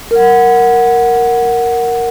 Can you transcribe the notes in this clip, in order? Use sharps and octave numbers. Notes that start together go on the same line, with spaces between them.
A#4 F#5